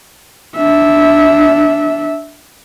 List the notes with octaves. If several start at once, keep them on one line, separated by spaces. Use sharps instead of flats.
D4 E5